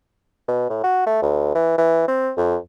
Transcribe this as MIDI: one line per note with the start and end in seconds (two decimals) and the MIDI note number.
0.48 0.69 47
0.70 0.79 45
0.84 1.02 66
1.07 1.19 57
1.22 1.51 38
1.55 1.76 52
1.78 2.06 52
2.08 2.31 60
2.37 2.57 41